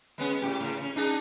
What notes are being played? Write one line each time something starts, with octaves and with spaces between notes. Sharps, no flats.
G#3 B3 C#4
A2 G4
A2 C#3
C#4
D4 D#4 G#4